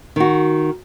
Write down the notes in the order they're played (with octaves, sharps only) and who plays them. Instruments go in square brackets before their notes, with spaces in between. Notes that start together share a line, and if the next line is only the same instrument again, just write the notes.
[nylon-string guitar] D#3 F#4